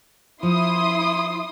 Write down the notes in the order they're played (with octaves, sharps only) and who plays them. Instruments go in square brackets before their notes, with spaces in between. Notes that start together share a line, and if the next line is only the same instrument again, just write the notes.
[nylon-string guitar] F3 [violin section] E4 C6 D#6